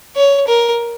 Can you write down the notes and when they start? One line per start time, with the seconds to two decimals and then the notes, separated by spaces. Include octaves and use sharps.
0.16 C#5
0.47 A#4